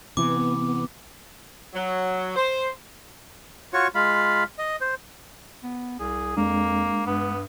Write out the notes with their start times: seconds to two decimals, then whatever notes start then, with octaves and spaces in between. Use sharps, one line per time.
0.17 C3 E3 B3 D6
1.74 F#3
2.36 C5
3.73 F4 F#4 C#5 C#6
3.95 G#3 F4 F5 B5
4.58 D#5
4.81 C5
5.63 B3
5.99 C2 G#4
6.37 F2 G#3 A#3 D4
7.06 G2 B3